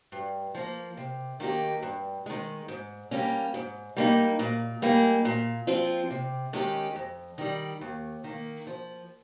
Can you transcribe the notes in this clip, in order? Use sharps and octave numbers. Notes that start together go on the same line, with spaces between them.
G2
F3 A#3
C3
D#3 A#3 D#4 G4
G2
D#3 G#3
G#2
G3 A#3 C#4
G#2
G3 A#3 D#4
A#2
G3 A#3 D#4 G#4
A#2
F3 C4 F4
C3
D#3 G#3 C#4 G4
F2
D#3 G3
D#2
D#3 A#3
F3